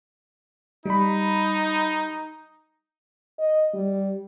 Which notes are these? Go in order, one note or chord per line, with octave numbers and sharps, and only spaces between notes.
G3 D#4 B5
D#5
G3